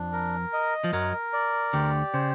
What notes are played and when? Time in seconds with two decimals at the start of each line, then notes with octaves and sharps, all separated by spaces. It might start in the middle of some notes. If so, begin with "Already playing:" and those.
Already playing: F2 F3 D4
0.12 A#4
0.53 D#5
0.84 F3
0.93 F#2 F#3 A#4
1.33 D5
1.73 D2 D3 G4
2.14 C#3 C5